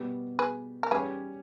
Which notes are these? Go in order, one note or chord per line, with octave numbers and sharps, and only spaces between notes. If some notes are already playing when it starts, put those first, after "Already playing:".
Already playing: B2 G3 B3 G4
G#4 B4
A#4
G3 C#4 G4 G#4 B4 C#5